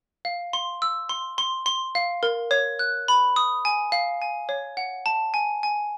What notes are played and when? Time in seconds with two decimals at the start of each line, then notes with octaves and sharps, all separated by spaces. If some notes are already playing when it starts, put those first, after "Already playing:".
0.25 F5
0.53 C6
0.82 E6
1.09 C6
1.38 C6
1.66 C6
1.95 F5
2.23 A#4
2.51 C#5
2.79 F#6
3.08 B5
3.36 D#6
3.65 G#5
3.92 F5
4.22 G#5
4.49 C#5
4.77 F#5
5.06 A5
5.34 G#5
5.63 G#5